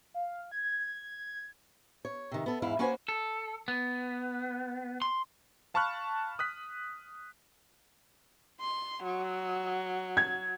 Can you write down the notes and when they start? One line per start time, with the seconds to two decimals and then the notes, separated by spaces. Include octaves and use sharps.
0.14 F5
0.52 G#6
2.05 C#5
2.32 C3 D#3
2.46 B3 A4
2.62 E2 G#2 E4 F5
2.79 A#3 C#4 F#4 B4 C5 G#5
3.09 A4
3.68 B3
5.02 C6
5.74 F5 A5 B5 C#6 F6 F#6
6.39 D#6 F#6 B6
8.60 C6
9.03 F#3
10.17 G#6